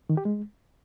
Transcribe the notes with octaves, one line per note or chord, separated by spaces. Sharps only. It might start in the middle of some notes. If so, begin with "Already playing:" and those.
D#3
G4
G#3